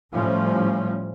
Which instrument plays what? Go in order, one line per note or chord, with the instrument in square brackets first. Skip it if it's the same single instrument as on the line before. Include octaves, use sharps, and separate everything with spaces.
[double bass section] A2 F3 G3 C#4